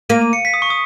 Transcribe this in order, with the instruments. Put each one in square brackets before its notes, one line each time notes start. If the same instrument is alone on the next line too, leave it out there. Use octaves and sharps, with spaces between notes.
[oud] A#3 [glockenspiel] D#7
[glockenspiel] D#7
C#7
B6
D#6
C#6
D#6